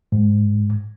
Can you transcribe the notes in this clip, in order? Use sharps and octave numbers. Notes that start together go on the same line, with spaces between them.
G#2